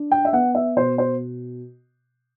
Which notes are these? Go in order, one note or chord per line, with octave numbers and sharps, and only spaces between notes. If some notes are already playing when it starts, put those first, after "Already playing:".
Already playing: D4
G5
E5
B3 F#5
E5
B2 C5
C5